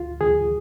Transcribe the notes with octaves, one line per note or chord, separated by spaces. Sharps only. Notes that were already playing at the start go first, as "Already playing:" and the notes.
Already playing: D2 F4
D2 G#4